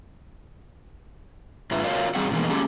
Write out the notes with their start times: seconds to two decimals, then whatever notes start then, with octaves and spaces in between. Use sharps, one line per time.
1.71 G#2 D3 F4 B4 E5
1.84 F4 F#4 A#4 C#5 D5 F5
2.15 E2 G3 C4 F#4 G#4 F#5
2.31 B2 D#3 E3 G3 G#3 A#3
2.49 F#3 G#3 A#3 C#4 G4 A4